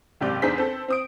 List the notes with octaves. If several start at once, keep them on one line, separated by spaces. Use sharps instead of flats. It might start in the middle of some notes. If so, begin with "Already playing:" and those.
F#1 G#2 C3 G4 D5 G6
E2 D4 D#4 G#4 C5 B6
C4 A4
C4 D#6 D7